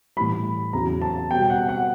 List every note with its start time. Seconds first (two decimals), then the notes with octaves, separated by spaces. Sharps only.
0.17 A2 E3 G3 B5
0.73 E2 C#3 F#3 A#5
1.02 A5
1.31 B2 G3 G5
1.42 G5
1.50 F#5
1.69 F#5